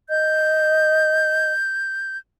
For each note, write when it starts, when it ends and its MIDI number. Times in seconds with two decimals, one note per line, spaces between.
0.09 1.52 75
0.09 2.17 91